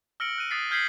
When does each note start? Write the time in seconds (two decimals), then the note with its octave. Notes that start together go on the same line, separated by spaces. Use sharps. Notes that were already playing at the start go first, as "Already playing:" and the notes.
0.20 E6 F6 A#6 C#7 D7 F#7
0.36 F6 F#6 D#7
0.51 D#6 G#6 A6 B6 C7
0.71 F6 G6 G#6 B6 C7 F#7